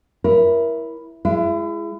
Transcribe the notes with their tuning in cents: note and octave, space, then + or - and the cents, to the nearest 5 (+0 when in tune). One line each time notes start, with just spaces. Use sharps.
E4 +0 A#4 +25 C#5 +0
G#3 +0 E4 +35